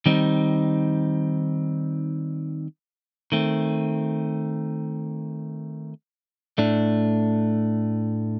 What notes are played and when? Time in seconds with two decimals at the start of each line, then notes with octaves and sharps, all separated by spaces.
0.06 D#3 G3 C4 D#4
3.32 D#3 A3 C4
6.58 A2 A3 D4